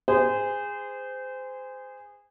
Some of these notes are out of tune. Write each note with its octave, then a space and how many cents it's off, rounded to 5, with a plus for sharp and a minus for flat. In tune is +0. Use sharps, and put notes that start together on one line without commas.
G#4 -20 C5 -25